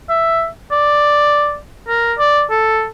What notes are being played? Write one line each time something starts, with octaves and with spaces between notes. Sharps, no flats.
E5
D5
A#4
D5
A4